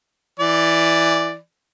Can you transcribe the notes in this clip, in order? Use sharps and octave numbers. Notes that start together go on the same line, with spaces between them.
E3 D5